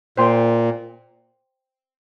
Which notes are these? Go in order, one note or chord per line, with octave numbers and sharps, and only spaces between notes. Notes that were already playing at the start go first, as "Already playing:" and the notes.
A#2 C5 G5 C6